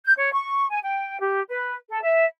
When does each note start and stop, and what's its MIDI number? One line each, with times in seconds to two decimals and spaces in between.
0.04 0.12 91
0.17 0.31 73
0.33 0.66 85
0.69 0.78 80
0.83 1.19 79
1.19 1.41 67
1.48 1.74 71
1.89 2.01 69
2.02 2.23 76